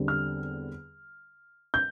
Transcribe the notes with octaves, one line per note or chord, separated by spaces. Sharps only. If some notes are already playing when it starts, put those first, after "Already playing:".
Already playing: E2 D3 G3 C4
F6
G6